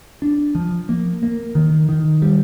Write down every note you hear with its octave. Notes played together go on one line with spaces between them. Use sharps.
D4
F3
A#3
A#3
D#3
D#3
G3